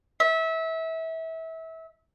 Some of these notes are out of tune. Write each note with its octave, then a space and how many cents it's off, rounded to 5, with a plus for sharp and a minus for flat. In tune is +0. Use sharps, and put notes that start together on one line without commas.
E5 -25